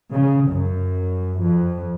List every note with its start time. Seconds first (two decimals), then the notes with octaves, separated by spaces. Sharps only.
0.11 C#3
0.50 F#2
1.41 F2